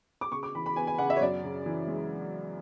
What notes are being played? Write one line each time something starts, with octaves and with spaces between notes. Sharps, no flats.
D6
C#3 C#6
D6
E3 B5
B5
B3 G#5
G#5
C#3 F#5
E5
C#5
F#2 D5
C#3
E3
G#3